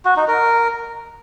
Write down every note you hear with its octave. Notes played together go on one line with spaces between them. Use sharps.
F#4
D#4
A#4